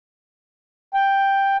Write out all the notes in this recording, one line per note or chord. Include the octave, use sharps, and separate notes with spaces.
G5